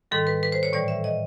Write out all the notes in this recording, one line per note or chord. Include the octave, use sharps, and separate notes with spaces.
G#2 D#3 G3 A4
B4
B4
C5
C#5
A2 E3 G3 D5
E5
D#5